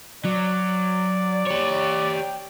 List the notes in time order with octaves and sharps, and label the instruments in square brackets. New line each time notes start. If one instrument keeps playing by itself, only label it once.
[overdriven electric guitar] F#3 [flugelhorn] D5
[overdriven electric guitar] G4 C#5
[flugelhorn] G5